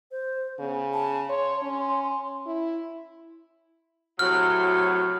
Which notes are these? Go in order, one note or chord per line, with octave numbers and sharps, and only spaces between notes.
C5
C#3 B3
A5
C#5 C6
C#4
E4
A2 C3 F#3 F6